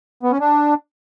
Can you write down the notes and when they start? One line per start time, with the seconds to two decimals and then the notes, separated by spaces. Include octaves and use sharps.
0.23 B3
0.32 C#4
0.40 D4